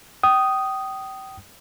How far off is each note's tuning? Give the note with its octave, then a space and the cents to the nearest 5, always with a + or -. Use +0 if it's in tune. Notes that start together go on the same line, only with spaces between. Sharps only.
G5 -30 D#6 +0